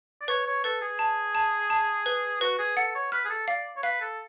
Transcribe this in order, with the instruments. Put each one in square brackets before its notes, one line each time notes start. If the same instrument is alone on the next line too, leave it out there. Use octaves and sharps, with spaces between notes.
[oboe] D5
[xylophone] B4 [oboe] C#5
[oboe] C#5
[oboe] A4 [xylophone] B4
[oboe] G#4
[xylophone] A5
A5
A5
B4
[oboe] F#4 [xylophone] B4
[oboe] G#4
[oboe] A4 [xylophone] F#5
[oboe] C#5
[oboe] B4 [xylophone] F6
[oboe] G#4
A4
[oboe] D5 [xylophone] F5
[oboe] C#5
[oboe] B4 [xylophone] F5
[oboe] A4